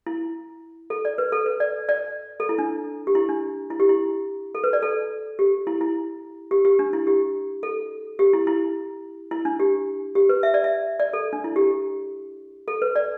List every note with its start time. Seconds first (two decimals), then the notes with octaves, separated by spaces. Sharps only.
0.07 E4
0.90 A4
1.05 D5
1.18 B4
1.32 A4
1.46 B4
1.60 D5
1.89 D5
2.40 A4
2.49 E4
2.58 D4
3.07 G4
3.15 E4
3.29 D4
3.70 E4
3.80 G4
3.89 E4
4.55 A4
4.64 B4
4.73 D5
4.82 A4
5.39 G4
5.67 E4
5.81 E4
6.51 G4
6.65 G4
6.79 D4
6.93 E4
7.07 G4
7.63 A4
8.19 G4
8.33 E4
8.47 E4
9.31 E4
9.45 D4
9.60 G4
10.15 G4
10.29 B4
10.43 E5
10.54 D5
10.64 E5
11.00 D5
11.13 A4
11.33 D4
11.44 E4
11.56 G4
12.68 A4
12.82 B4
12.96 D5